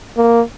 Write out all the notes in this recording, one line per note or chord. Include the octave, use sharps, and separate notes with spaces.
A#3